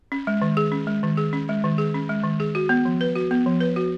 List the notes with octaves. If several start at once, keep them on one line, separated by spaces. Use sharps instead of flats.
C#4
G#3
D#3
G#4
C#4
G#3
D#3
G#4
C#4
G#3
D#3
G#4
C#4
G#3
D#3
G#4
F#4
B3
F3
B4
F#4
B3
F3
B4
F#4